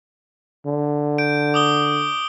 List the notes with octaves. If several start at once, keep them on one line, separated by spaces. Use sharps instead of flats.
D3
G6 D7
D6 D#6 G7